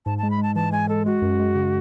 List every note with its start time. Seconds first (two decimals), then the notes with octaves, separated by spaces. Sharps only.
0.06 G#2 A5
0.18 G#3 A5
0.30 B5
0.38 G#3 A5
0.56 E3 A5
0.72 G#3 G#5
0.89 G#3 A4
1.06 G#3 F#4
1.22 F#2
1.39 G#3
1.55 C#3